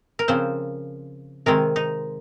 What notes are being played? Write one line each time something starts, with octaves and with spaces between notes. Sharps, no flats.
A#4
C#3 F3 C4 C5
C3 D#3 G#3 C4 A#4
D#4